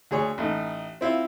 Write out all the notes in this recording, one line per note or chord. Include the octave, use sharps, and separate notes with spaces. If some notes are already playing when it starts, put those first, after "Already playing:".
D2 G#4 C#5
A1 A3 D#4
C4 E4 F4